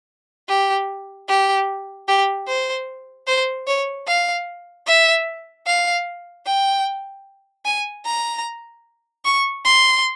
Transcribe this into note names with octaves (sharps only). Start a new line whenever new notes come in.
G4
G4
G4
C5
C5
C#5
F5
E5
F5
G5
G#5
A#5
C#6
C6